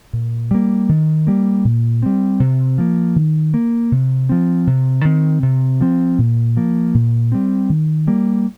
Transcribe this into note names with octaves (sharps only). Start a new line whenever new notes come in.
A#2
G3 A#3
D#3
G3 A#3
A#2
G3 C4
C3
F3 A#3
D#3
A#3
C3
F3 C4
C3
D#3 C4
C3
F3 C4
A#2
F3 A#3
A#2
G3 C4
D#3
G3 A#3